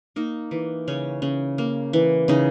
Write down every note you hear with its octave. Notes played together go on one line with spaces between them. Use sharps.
A#3 D#4
E3
C#3 C#4
C#3
A#3
E3
C#3 D#4